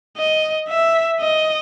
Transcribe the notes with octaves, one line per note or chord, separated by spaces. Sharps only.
D#5
E5
D#5